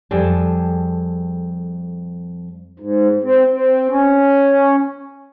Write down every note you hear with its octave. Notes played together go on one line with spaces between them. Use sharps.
F2 G3 G#4 A4
G#2
C4
C4
C#4